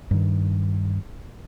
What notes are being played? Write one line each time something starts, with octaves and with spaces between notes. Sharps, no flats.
G2 D#3